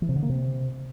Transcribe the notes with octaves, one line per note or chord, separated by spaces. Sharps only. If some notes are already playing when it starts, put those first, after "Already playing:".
E3
C3
D3
A#3
C3